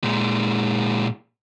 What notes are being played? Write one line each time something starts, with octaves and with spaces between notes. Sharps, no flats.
A#2 G#3